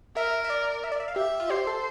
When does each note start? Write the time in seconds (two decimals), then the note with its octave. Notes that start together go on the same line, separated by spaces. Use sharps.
0.17 A#4 E5
0.44 E5
0.50 D5
0.84 E5
0.92 D5
1.00 E5
1.08 F5
1.16 G4 E5
1.40 F4
1.50 G4 C5
1.67 A4